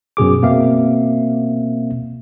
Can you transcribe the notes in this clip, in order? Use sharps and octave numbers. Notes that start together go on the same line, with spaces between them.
F#2 B2 G#4 D6
B2 A#3 C4 E5 F5